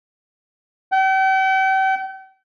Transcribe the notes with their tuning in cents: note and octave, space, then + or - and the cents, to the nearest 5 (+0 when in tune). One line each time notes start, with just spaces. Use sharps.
G5 -40